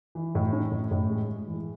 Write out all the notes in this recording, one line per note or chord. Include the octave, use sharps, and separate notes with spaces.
E3
A2
C#4
A2
A2
G#3
G#3
E3